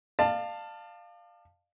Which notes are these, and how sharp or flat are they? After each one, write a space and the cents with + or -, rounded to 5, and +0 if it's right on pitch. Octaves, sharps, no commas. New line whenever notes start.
D5 +40 F5 +0 A5 +15